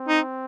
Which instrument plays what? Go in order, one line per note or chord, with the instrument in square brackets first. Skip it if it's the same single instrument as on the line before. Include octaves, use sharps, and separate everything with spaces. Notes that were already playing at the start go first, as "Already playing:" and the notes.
Already playing: [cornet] C4
[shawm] D#4